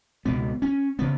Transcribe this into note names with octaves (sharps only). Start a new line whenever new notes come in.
C#2 B2 B3
C#4
C#3 B3